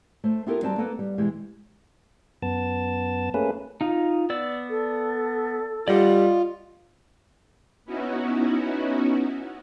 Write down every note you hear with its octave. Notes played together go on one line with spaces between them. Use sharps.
A3 C5
B3 E4 F4 G4 A4 A#4
F#3 G3 C4 B4 A5
A#3 B3 A4 B4
G3
B2 E3 G#3 G4
F#2 B3 A5
A3 A#3 C#4 G#4 B4
D#4 F4
B3 D5 E6
A4
G3 F4 D5 D#5 F#5
B3 C#4 D#4 E4 F#4